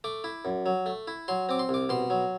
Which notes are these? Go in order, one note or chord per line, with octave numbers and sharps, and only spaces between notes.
A3 D6
E4
F#2
F#3
A3
E4
F#3 C6
C4 D6
C6
C2 D6
B2 C6
F#3